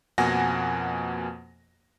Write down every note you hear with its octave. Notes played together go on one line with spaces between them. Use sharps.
F2 B2 A#3 F#5 G#5 A#6